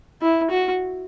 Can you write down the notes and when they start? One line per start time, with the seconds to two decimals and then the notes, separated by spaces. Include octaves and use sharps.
0.22 E4
0.50 F#4